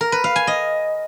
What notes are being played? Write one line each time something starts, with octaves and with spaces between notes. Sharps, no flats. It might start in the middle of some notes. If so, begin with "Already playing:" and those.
A#4
B4
F5
G#5
D#5